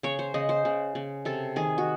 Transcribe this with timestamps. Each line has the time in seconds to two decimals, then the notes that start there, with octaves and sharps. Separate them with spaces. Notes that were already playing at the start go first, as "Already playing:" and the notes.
0.03 C#3 C#5
0.19 C5
0.34 C#3 D#5
0.49 C5
0.65 C#3
0.95 C#3
1.25 C3 A4
1.56 D#3 G#4
1.78 F#4